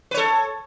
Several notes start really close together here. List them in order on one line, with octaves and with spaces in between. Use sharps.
B4 C#5 A4